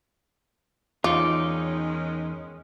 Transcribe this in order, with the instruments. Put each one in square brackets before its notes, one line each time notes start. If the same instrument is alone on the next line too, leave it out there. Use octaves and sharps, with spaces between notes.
[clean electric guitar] E2 D#4 [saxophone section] D#3 G#3 C#4 [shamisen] F4 [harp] D6